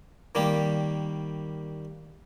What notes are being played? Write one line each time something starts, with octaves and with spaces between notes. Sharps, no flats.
D#3 G3 A#3 G4